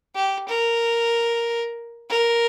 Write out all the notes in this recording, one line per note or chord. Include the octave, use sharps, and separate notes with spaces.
G4
A#4
A#4